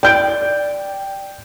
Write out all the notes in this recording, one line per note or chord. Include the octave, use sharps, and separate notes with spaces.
D5 G5 G6 D7